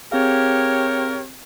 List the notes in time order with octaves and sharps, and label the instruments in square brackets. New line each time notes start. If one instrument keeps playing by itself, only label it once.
[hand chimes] C4 G#4 F5 [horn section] G4 C#5 [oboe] A#4